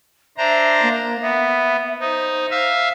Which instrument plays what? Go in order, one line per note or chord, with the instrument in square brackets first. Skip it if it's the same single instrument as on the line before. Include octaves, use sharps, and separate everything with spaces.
[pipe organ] D4 C5 A#5 [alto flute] E5
[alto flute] A#3
[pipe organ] B3 [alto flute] E5
[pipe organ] D#4 [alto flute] C5
[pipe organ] E5 F5